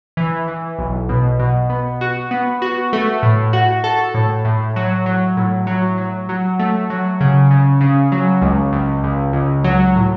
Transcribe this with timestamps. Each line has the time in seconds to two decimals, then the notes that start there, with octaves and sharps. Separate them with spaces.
0.17 E3
0.48 E3
0.79 B1
1.09 B2
1.39 B2
1.70 B3
2.01 F#4
2.31 B3
2.62 F#4
2.93 A3
3.23 A2
3.53 F#4
3.84 A4
4.14 A2
4.45 A2
4.76 F#3
5.06 F#3
5.37 A2
5.67 F#3
5.98 F#3
6.29 F#3
6.60 A3
6.90 F#3
7.21 C#3
7.51 C#3
7.81 C#3
8.12 F#3
8.42 C#2
8.72 C#2
9.04 C#2
9.33 C#2
9.64 F#3
9.95 A2